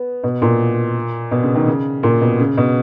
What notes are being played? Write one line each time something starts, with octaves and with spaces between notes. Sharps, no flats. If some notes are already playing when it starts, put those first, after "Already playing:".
Already playing: B3
B2
A#2
B2
C#3
D#3
C#3
A#2
B2
C#3
B2